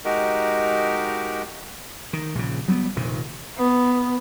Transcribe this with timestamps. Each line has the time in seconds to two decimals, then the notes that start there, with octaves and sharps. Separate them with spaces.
0.05 G#3 D#4 F#4 G4 A#4
2.13 D#3
2.35 A#1 C#3
2.68 F#3 G3 A3 B3
2.96 F1 A#1 A#2 D#3
3.57 B3